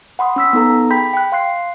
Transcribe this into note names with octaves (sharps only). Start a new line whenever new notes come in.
F#5 B5 C6 D#6
C#4 E6 B6
B3 D#4 A4 A#5
G#4 G5 B5 G6 B6
G5 F#6
F5 C6 F#6 C7